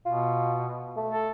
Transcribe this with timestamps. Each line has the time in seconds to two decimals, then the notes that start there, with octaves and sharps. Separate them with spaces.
0.06 B2 F4
0.97 A3
1.11 A4